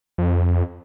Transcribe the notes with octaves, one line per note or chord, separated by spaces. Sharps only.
F2